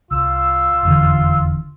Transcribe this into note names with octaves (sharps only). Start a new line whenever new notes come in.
C2 F4 E6
F1 E2 D3